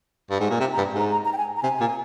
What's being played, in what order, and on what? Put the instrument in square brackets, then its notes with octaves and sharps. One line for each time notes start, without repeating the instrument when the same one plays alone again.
[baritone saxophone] G2
G#2
A#2
[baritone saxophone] C3 [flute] A#5
[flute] A#5
[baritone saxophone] G2
[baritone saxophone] G#2 [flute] A#5
[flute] A#5
A#5
G5
G#5
A#5
[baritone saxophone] C3 [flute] G#5
[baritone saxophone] A#2